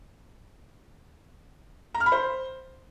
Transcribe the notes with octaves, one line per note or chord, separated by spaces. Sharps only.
A#5
F6
B5
C5